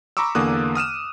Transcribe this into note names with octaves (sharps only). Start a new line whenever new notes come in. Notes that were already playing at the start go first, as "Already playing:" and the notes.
A#5 B5 C#6 D6 E6
E2 D3 A#3 D6 D#6 F#6
D#6 F6 D#7 E7